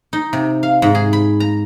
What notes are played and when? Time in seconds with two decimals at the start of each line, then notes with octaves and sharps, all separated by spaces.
0.13 D#4
0.33 C3
0.63 F5
0.82 G#2
0.95 G#4
1.13 B5
1.40 A#5